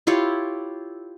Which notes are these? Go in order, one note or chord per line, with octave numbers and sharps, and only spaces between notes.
E4 F4 G4 C#5